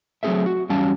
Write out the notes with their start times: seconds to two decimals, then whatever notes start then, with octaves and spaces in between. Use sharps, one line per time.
0.23 F#3 A3 C4 G#4 A#4 E5
0.46 F#4
0.69 E2 F#3 G3 C#4 F5 A5